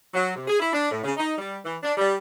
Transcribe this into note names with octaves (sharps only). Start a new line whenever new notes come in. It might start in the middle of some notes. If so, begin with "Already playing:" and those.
F#3
C3
G#4
E4
D4
A2
C#3
D#4
G3
E3
D4
G3